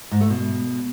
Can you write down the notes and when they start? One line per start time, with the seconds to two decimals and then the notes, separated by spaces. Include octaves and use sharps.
0.11 G#2
0.21 A3
0.30 B2